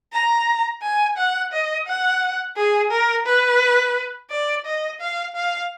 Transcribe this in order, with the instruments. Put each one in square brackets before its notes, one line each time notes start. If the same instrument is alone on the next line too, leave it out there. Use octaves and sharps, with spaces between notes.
[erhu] A#5
G#5
F#5
D#5
F#5
G#4
A#4
B4
D5
D#5
F5
F5